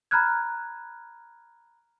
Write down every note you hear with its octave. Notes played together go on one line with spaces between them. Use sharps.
A#5 B5 F6 F#6 G#6